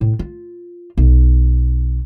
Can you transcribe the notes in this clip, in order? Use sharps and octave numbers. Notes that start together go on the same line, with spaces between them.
A2
F4
B1